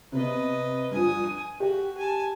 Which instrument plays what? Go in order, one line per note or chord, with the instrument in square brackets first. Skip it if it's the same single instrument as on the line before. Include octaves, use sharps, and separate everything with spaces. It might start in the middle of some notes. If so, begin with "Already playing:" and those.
[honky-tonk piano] C3 B3 [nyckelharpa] B4 D#5
[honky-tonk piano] G2 F3 [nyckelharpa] G#5 D#6
[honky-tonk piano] D#7
[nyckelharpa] F#4 [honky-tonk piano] G4
[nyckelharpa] G#5 A5